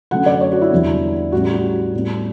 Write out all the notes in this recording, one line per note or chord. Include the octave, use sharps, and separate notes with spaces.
F#2 D3 A3 C#4 F#5
D5
C#5
F#4
E4
E2 D3 G3 B3
A2 G3 C#4 F#4
G4
F#4
A2 G3 B3